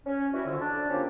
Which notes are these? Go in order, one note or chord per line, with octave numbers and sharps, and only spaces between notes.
C#4
G3 E4 F#4
F2 D3
D4
A#3 C4 C#4 F4 G4